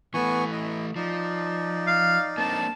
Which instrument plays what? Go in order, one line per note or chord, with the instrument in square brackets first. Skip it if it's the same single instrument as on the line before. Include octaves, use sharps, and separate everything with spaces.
[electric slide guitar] E3 A3 [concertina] B3 G#5 C#6
[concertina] E4 D#5
[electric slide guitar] F3 [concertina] D#4 D5
[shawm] F5
[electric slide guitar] A#3 C4 D4 [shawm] A5